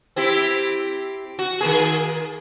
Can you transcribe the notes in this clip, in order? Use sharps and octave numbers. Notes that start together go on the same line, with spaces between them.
C4 E4 G4
F#4
D#3 A#3 G#4